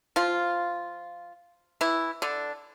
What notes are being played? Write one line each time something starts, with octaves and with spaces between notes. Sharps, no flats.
F3 F4
E3 E4
D3 D4